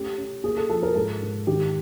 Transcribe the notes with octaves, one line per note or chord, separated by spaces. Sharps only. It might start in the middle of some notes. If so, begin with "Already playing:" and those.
Already playing: A3 C#4 G4
C#4
A#3 G#4
A4
F3 A4
A#4
G#2 A4
G#2
D#3 G4